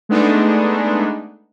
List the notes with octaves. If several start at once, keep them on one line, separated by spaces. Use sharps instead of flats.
G#3 A3 B3 D4 D#4